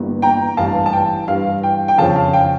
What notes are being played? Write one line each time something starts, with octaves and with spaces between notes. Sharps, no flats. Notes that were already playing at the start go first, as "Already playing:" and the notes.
Already playing: G1 G2 E3 A#3
G5 A#5
A1 G2 E3 F5 A5
A5
G5
G2 E3 G3 F5
G5
G5
F2 C#3 F3 C#4 F5 A5
F5
G5